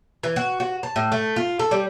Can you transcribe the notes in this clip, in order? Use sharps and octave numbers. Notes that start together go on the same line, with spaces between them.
E3
F#4
F#4
A5
A2
A3
F4
A4
G3